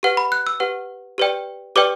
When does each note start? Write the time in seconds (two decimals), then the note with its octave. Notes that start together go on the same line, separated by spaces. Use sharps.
0.03 G4 B4 F#5
0.17 B5
0.32 F#6
0.47 E6
0.60 G4 B4 F#5
1.18 G4 B4 D5 G5
1.76 G4 B4 D5 G5 D6